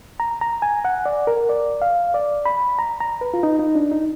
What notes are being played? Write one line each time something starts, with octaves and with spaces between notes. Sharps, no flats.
A#5
A#5
G#5
F#5
D5
A#4
D5
F5
D5
B5
A#5
A#5
B4
F4
D#4
D#4
D4
D#4